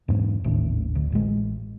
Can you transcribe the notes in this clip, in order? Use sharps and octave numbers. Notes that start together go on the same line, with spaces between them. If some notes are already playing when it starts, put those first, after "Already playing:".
E2 G#2
G#1 D#2 A2 D4
D2
A1 G#3